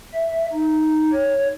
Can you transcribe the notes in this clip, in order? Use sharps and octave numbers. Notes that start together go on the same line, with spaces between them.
E5
D#4
C#5